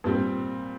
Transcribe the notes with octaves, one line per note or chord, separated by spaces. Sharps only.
G2 A#2 G3 C4